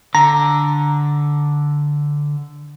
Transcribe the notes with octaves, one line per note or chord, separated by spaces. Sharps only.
D3 A#5